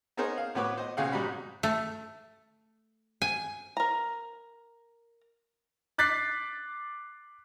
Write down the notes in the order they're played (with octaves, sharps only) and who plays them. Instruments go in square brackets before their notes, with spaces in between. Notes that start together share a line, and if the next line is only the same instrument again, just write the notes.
[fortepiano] B3 D#4 G#4 A#4 C5 C#5
F5
A2 B3 F#4 B4 C#5 D6
C5 D#5
B1 C#3 G#4 F5 F#5
G#2 F#3 G3 B5
[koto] A3
G#5
[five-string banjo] A#4 A#5
[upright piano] D6 F#6 A6 B6 C7